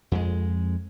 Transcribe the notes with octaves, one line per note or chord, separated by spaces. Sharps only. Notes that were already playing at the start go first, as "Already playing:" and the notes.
F2 G#3